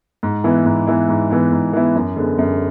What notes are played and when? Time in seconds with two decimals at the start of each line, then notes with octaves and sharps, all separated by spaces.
0.23 G#2
0.44 E3 B3 E4
0.65 G#2
0.87 E3 B3 E4
1.09 G#2
1.30 E3 B3 E4
1.51 G#2
1.73 E3 B3 E4
1.95 F#2
2.16 D3 G#3 B3
2.38 F#2